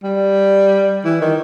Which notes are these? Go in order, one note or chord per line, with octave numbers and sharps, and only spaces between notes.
G3
E3
D#3